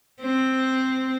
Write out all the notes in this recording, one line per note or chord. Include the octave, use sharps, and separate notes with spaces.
C4